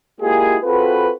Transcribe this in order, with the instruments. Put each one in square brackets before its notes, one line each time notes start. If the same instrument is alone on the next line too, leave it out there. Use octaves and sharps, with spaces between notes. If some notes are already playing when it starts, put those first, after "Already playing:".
[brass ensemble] G#3 A#3 E4 F4 G4 G#4
C4 F4 F#4 G#4 A4 B4